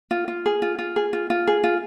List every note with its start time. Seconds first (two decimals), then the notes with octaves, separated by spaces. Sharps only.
0.11 F4
0.28 F4
0.46 G#4
0.62 F4
0.79 F4
0.96 G#4
1.13 F4
1.30 F4
1.47 G#4
1.64 F4